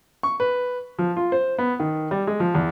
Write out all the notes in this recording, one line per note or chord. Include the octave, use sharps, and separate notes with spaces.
C#6
B4
F3
F4
C5
B3
D#3
G3
G#3
F3
E2